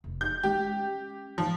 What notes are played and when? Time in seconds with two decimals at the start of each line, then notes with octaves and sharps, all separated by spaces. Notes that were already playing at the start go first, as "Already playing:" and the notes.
0.04 F1
0.21 G6
0.43 G#3 C#4 G4
1.38 G#2 F3